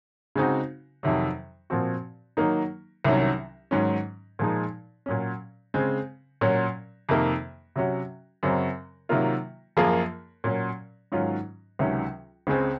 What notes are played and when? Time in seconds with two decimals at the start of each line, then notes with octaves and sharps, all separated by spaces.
0.36 C#3 G#3 C4 D#4 F#4
1.03 F2 C3 D#3 F#3
1.70 A#2 F3 C4 F#4
2.37 D#3 F#3 A#3 D#4
3.05 C2 C3 D#3 F#3 C#4
3.71 G#2 D#3 F#3 C#4
4.39 A#2 F3 G#3 D#4
5.06 A#2 F#3 C#4
5.74 C#3 G#3 C4
6.41 A#2 F#3 C#4
7.09 F2 C3 D#3 A#3
7.76 C3 F#3 C#4 F#4
8.43 F#2 C#3 F#3 C4
9.09 C3 D#3 F#3 A#3 F4
9.77 F#2 F3 A#3 F4 G#4
10.44 A#2 F#3 C#4
11.12 G#2 D#3 F#3 C#4 F4
11.79 C#2 C3 D#3 F#3 C#4
12.47 C#2 C#3 G#3 C4